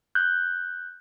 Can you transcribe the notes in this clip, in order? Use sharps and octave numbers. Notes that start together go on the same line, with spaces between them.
F#6 G6